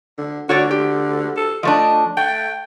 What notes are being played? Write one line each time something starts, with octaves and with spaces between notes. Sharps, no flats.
D3
D3 F#4 C#5 D5
G4
A4
F3 A3 D4 D#5
A3 G5